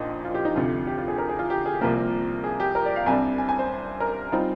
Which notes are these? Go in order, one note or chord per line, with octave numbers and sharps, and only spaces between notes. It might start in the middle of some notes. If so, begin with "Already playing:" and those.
Already playing: A#1 A#2 F3 C4 D#4 D#5
F4
G4
D#4
D2 C3 F3 F4
G4
F4
G#4
A#4
G#4
F4
G4
G#4
C2 C3 F3 A#3 A#4
G#4
G4
A#4
D5
F5
C2 C3 G3 D4 G#5
G#5
G#5
C5
A#4
G3 C4 D#4 F4